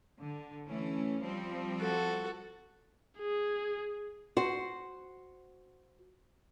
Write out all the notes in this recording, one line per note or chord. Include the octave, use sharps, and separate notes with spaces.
D3
E3 A3 C#4
F3 G3 C4
F#4 A4
G#4
F#4 C5